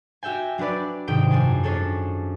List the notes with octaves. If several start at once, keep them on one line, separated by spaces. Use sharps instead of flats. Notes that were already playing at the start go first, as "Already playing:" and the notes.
F#4 G4 E5 G5 G#5
F#3 D4 G4 B4 D5
G#2 C3 D#3 G5 D#6 D7
F#2 F3 D4 G#5
C#4 D4 G#4 A4 C#5